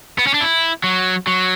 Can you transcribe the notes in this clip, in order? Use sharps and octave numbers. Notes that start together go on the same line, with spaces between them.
B3
C#4
D4
E4
F#3
F#3